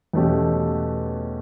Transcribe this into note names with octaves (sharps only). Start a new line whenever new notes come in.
E2 B2 A3 C#4 G4